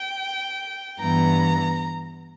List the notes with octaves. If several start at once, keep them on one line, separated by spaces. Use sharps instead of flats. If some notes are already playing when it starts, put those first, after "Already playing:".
Already playing: G5
G2 E3 B3 A#5